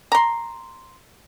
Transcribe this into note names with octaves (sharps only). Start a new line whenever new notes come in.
A#5 C6